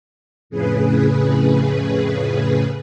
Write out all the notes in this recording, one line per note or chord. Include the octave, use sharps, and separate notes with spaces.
F2 A2 C#3 G#4 B4